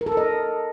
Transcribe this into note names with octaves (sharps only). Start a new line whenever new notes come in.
A#4
A4
A#4
D#5